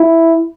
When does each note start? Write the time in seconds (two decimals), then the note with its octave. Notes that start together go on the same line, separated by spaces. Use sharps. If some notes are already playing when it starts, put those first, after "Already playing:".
Already playing: E4